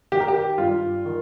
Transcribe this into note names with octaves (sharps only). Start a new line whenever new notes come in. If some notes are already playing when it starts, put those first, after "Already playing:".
D#3 G4
A#4
G4
G2 F4
D#3